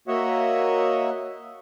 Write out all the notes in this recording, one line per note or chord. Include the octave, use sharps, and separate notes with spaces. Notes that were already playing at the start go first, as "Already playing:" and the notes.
A#3 F#4 C#5 D#5 E5 F#5